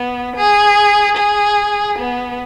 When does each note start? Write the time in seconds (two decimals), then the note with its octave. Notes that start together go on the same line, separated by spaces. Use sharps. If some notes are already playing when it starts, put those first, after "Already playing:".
Already playing: B3
0.36 G#4
1.17 G#4
1.98 B3